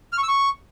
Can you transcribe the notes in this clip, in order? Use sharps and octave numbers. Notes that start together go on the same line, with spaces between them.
F6
C#6
E6
C#6